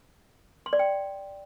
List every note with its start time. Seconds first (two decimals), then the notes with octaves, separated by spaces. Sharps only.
0.66 C6
0.73 D5
0.79 G5